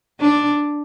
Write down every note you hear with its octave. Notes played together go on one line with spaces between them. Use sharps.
D4